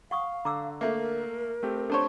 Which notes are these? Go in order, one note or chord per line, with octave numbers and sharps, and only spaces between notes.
F5 F#5 C#6 D#6
D3 A#5 D6 E6
A3 A#3 E5
A#4
A3 C4 G4
D4 A4 C5 C#5 A5 C#6